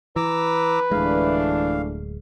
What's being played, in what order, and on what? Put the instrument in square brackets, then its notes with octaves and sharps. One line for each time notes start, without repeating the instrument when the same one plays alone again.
[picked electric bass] E3 [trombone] B4 [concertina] A#5 D6 E6
[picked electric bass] D1 G#3 [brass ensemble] E3 A3 D4 [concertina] F5